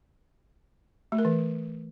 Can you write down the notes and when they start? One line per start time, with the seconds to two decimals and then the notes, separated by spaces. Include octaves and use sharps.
1.12 A3
1.18 A#4
1.25 E3